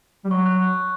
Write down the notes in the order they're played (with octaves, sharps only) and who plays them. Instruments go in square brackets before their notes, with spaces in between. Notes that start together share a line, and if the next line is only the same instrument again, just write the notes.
[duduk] G3
[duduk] F#3 [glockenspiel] C#6
[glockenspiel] F#6